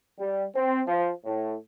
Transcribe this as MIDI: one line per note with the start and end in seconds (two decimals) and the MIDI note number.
0.19 0.45 55
0.55 0.81 60
0.87 1.10 53
1.25 1.55 45